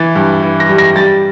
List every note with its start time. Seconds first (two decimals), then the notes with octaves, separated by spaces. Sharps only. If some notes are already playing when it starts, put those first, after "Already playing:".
Already playing: E3 A6
0.15 G2
0.43 E3
0.60 A#6
0.69 G3
0.78 A#6
0.96 G3 A6